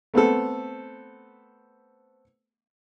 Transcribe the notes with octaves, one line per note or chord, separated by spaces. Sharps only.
A3 B3 C4 A4